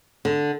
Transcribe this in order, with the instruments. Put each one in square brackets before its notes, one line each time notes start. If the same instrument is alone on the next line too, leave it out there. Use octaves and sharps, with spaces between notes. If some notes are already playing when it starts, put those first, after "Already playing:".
[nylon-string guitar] D3